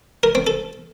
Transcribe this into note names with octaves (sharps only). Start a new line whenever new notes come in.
A#4
C4
A4